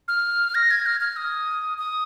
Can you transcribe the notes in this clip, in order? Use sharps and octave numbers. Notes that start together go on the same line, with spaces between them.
F6
A#6
G#6
F6
F6
D#6
D#6